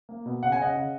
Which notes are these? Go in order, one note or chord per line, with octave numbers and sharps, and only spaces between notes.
A#3
B2
C#3 F#5
G#5
C#3 D#5 F#5
C#3